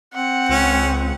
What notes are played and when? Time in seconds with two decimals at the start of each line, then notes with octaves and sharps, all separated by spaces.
0.14 C4 F#5
0.49 C#2 C#4